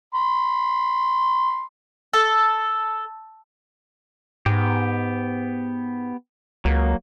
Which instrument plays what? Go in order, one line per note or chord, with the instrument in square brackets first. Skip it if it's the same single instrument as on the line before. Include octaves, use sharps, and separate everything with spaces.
[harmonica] B5 C6
[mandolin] A4
[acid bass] G#2 [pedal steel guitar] B3 G4
[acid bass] C#2 [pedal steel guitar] F#3 A#3